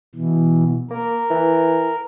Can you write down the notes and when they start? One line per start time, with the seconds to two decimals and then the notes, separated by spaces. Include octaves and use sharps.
0.15 B2 E3
0.91 A#3 A#4
1.30 E3